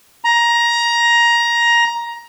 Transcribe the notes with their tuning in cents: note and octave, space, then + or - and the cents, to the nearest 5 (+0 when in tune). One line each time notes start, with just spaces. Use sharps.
A#5 +15